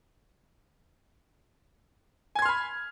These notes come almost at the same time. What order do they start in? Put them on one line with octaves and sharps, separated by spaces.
G#5 G#6 C6 F6 B5